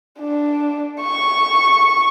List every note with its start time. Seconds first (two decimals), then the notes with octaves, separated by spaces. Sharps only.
0.20 D4
1.02 C#6